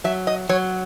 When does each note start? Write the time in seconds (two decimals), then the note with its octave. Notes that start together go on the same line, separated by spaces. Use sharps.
0.04 F#3 E5
0.27 D#5
0.49 F#3 C#5